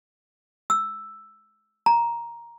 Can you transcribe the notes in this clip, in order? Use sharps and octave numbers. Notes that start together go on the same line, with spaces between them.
E6
A#5